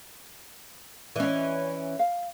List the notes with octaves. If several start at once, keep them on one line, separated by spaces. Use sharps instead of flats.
E3 C#4 D5 D#5
F5